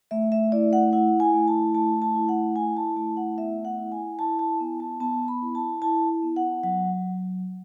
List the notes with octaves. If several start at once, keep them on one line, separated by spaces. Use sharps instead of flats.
A3 E5
E5
E4 D5
F#5
E4 F#5
G#5
A3
A5
A3 A5
A5
E4
F#5
E4 G#5
A5
A3 A5
F#5
B3 E5
F#5
E4
G#5
E4 A5
A5
B3 G#5
A5
B3 A5
B5
E4
A5
E4 A5
B3
F#5
F#3 F#5